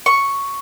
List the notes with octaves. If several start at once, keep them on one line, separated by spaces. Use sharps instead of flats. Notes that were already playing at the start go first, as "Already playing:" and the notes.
C#6